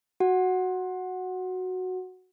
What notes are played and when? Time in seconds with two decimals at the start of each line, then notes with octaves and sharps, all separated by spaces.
0.20 F#4 F#5